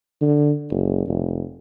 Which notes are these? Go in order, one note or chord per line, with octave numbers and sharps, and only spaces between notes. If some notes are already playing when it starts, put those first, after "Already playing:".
D3
F#1
F1